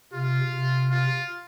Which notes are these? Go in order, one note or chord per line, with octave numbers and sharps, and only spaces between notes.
C3 F4
C3
F4